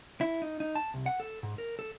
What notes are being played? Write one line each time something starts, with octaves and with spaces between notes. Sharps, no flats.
E4
D#4
D#4
A5
C2
F#5
A4
G#2
A#4
A4